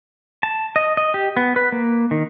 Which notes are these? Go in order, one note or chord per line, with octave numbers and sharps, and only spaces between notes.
A5
D#5
D#5
G4
B3
B4
A#3
D#3